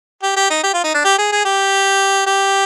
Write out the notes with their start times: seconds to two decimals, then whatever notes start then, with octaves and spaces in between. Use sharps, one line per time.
0.23 G4
0.36 G4
0.50 D#4
0.63 G4
0.74 F4
0.84 D#4
0.94 D4
1.04 G4
1.18 G#4
1.32 G#4
1.45 G4
2.27 G4